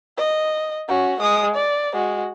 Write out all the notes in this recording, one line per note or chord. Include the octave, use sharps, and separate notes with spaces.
D#5
C#4 F#4
G#3 D#6
D5
G#3 F#4